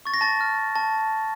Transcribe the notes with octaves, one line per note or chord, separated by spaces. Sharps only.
C#6 A6
A#6
A5 A6
F6
A5